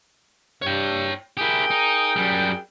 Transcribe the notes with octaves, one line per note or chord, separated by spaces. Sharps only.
G2 C#5 G5
E4 G4 G#4 A#4 G5
D#4
F#2 G3